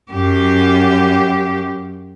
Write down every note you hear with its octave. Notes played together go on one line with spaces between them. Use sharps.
F#2 G4